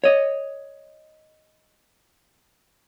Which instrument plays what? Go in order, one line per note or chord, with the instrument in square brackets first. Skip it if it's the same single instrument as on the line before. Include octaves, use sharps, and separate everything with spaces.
[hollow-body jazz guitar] C#5 D#5